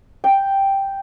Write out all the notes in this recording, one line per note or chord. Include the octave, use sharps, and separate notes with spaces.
G5